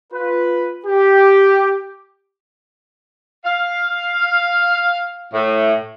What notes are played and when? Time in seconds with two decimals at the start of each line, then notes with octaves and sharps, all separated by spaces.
0.13 F4 B4
0.86 G4
3.45 F5
5.34 A2